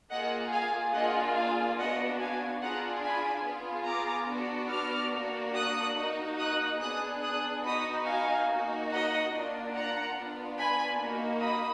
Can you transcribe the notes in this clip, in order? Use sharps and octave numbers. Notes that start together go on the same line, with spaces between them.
A#3 F4 G#4 D#5 F#5
F5 G#5
A#3 D4 F4 G#4 D#5 F#5
F5 G#5
B3 D4 F#4 D#5 F#5
F5 G#5
D4 F4 G#4 F#5 A#5
G#5 B5
B3 F4 G#4
A#5 D6
B3 D4 F#4
D6 F6
A#3 D4 F#4
D#6 F#6
A#3 D#4 F#4
D#6 F#6
B3 D4 G#4 D#6 F#6
D#6 F#6
B3 D#4 F#4 B5 D#6
F5 G#5
A#3 D#4 F#4
D#5 F#5
A#3 D4 F4
F#5 A#5
B3 D4 F4
G#5 B5
A#3 D#4 F#4
B5 D#6